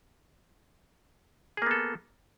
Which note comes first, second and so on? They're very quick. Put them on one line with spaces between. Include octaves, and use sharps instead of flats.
G#4 A#3 B3 A4